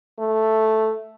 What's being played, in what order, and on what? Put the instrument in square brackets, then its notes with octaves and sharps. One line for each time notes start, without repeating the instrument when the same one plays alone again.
[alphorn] A3